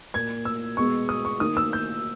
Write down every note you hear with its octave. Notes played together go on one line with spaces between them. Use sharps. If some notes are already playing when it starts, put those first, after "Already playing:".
A#2 A#3 G#6
E6
B2 G#3 B3 C#6
D#6
C#6
D#3 A#3 D#6
E6
G6